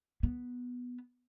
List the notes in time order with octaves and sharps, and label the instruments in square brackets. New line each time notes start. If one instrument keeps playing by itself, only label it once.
[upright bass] B3